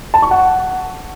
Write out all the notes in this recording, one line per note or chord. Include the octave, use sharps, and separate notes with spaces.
A5
C#6
F#5